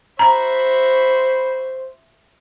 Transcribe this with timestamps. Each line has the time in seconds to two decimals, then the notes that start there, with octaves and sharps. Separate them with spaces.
0.19 F#4 C5 E5 A#5 B5